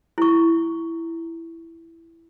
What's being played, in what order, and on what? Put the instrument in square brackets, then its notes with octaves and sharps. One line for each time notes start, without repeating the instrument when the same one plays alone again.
[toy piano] E4 C#6